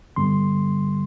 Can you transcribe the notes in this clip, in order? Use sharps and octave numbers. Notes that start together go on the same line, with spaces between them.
G2 D3 G3 B3 C6